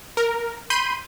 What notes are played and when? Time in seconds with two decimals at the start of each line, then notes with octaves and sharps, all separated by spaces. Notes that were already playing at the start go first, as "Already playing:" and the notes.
0.17 A#4
0.70 B5 C6 G6 D#7